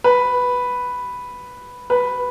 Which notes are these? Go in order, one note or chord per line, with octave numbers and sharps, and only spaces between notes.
B4
B4